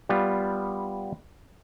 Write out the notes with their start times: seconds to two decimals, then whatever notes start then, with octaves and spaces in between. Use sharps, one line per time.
0.09 G3 B3 F4